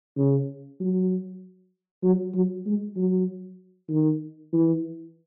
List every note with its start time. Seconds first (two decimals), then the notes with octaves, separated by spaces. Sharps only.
0.18 C#3
0.80 F#3
2.04 F#3
2.35 F#3
2.66 G#3
2.97 F#3
3.90 D#3
4.53 E3